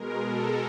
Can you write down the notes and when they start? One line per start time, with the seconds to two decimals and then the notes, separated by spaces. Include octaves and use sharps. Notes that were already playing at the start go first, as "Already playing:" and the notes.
Already playing: B2 G#3 A#4
0.23 A4